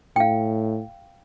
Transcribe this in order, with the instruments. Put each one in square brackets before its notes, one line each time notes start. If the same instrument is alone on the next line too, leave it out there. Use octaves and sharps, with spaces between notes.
[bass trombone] A2 [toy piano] F5 G5